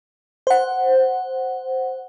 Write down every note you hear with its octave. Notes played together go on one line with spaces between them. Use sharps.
C5 F#5